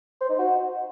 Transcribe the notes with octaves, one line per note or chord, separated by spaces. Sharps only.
C5
D#4
F#4